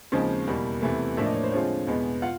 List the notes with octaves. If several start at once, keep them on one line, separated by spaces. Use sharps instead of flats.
D#2 C#3 F3 G#3 C4
E2 B2 G3 A#3
E2 C3 E3 A3
A2 F3 A#3 D4 E5
D#5
C#5
C5
D3 F3 G#3 C4 F4 C#5
E2 B2 G#3 B3
F4 F#5